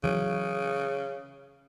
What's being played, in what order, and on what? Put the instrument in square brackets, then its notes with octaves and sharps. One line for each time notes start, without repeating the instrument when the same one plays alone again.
[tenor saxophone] C#3 [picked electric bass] E3 F#3